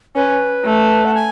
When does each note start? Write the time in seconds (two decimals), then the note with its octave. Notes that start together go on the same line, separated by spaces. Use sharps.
0.16 C#4 B4
0.65 A3
1.05 F#5
1.15 G#5